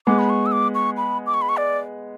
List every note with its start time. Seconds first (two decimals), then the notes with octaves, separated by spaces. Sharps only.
0.07 G#3 B3 D6
0.19 B5
0.30 C#6
0.46 E6
0.52 D6
0.75 C#6
0.97 B5
1.26 D6
1.34 C#6
1.42 B5
1.49 C#6
1.57 D5